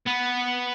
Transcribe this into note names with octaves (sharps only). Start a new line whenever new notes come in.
B3